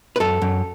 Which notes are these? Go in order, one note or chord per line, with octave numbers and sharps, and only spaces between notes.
B4
F#2 A4
F#2